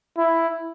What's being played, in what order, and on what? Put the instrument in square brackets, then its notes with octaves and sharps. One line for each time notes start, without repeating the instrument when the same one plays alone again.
[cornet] E4